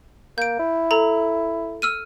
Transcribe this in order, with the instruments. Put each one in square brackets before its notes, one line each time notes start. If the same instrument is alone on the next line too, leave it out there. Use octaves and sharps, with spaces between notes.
[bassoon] A#3 [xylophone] G6 D7
[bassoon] E4
[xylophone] A4 A#5
E6 F6 D#7